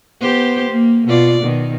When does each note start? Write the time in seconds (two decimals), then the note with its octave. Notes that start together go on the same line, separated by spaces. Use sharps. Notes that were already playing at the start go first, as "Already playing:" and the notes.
0.21 B3 G4 C5
0.70 A#3
1.07 B2 F4 D5
1.40 B2 D#3